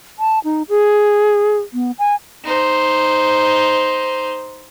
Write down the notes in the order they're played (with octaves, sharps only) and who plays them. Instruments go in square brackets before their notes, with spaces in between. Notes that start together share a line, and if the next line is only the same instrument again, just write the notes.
[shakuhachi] A5
D#4
G#4
B3
G#5
[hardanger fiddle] D#4 C5